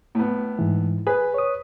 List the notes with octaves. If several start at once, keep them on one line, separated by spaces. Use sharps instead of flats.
A2 B3
G#2 E3
G#4 B4
C#5 D#6